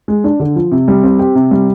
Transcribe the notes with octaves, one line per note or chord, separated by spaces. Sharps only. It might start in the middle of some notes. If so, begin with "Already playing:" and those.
G#3
D4
D3
F3
C3
G3
C4
G4
C3
G3